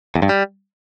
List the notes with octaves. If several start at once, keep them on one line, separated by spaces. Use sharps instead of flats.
E2
G2
G3